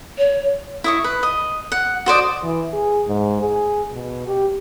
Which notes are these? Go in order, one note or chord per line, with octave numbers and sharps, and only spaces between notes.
C#5
E4 D#5 C#6
B4
D#5
F#5
F#4 C5 D5 D#5
E3
G#4
G#2
G#4
B2
G4